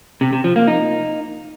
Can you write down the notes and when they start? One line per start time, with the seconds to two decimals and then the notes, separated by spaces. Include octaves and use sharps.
0.21 C3
0.33 C3
0.44 F3
0.56 A#3
0.67 D#4